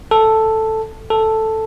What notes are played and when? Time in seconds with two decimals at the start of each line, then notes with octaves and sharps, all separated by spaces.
0.11 A4
1.10 A4